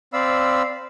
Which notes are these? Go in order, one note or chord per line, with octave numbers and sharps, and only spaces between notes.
C4 D5 F5 B5 E6